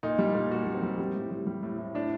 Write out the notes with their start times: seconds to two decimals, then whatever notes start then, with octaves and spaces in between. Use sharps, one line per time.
0.03 A#2 D#4
0.19 G3
0.35 A#2
0.51 A#2 F#4
0.67 G3
0.75 C4
0.82 G3
0.99 G3
1.15 A2
1.31 G3
1.47 G3
1.63 A2
1.78 A2
1.94 A2 D4